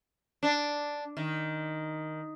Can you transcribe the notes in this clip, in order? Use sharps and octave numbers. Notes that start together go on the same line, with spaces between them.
D4
D#3